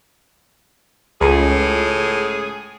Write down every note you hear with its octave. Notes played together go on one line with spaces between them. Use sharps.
C#2 A2 G#4